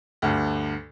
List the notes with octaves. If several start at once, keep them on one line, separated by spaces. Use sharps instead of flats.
D2 G2